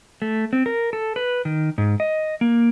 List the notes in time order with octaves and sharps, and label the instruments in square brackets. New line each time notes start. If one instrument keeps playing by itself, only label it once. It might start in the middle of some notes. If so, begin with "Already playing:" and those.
[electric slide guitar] A3
C4
A#4
A4
B4
D#3
G#2
D#5
A#3